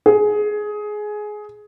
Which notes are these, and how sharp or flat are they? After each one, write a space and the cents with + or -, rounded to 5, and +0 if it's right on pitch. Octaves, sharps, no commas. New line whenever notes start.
G#4 +15